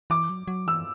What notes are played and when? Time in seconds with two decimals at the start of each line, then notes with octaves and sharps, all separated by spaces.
0.10 E3 D6
0.30 F#3
0.48 F#3
0.67 E3 E6